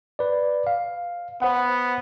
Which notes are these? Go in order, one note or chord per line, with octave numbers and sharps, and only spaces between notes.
B4 D5
F5
B3 C5 F#5